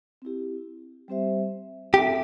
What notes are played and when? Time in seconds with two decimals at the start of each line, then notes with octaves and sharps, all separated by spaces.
0.22 C4 E4 G4
1.08 G3 C4 G4 C5 E5
1.94 C4 G4 A4 E5